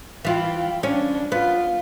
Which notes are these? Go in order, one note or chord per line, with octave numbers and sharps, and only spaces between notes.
E3 F4 F5 G5
C#4 D4
B3 F4